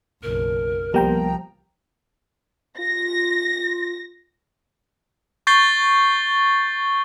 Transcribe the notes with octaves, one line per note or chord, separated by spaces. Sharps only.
F#1 B1 A#4
C2 F3 G3 A#3 B3 A#4 G5 A#5
F4 A#6
C#6 G6 A6 C7 G7